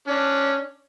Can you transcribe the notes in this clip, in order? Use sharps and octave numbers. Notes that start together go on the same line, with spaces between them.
C#4 D4